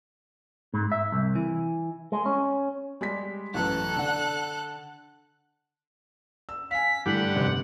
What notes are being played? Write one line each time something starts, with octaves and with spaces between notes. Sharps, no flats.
G#2
E5
C2
E3
G#3
C#4
G3 G#3 B6
A1 F#2 A4 B4 F#6
D3 F#5
E6
F5 G#5 B6
G2 D3 E3 A3 G4 F#5
F1